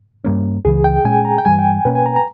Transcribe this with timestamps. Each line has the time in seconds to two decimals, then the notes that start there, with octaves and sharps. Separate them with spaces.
0.24 G2 G3 A#3 C#4
0.65 C#2 C#3 E3 G#4
0.84 G5
1.05 A#2 G#3 C#4 G#5
1.25 A#5
1.38 G5
1.45 G2 E3 G3 G#5
1.59 G5
1.85 B2 A#3 C#4 B4
1.95 G#5
2.06 A#5
2.16 A#5